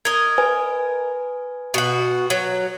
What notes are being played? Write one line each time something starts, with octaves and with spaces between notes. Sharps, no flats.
A#4 D#5 G#6
B4 G#5
B2 F#4
F#3